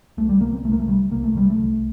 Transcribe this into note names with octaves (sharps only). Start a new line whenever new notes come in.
C2 A3
G3
C3 A#3
C4
C2 A3
A#3
A3
C3 G3
C2 A#3
A3
C3 G3
A3
C2